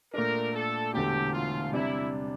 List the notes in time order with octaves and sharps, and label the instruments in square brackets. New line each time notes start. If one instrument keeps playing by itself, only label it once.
[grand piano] A#2 A3 D4 [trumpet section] A#4
[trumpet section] A4
[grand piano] E1 E2 D3 A3 [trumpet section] G4
[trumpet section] F4
[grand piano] C3 G3 D4 [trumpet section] E4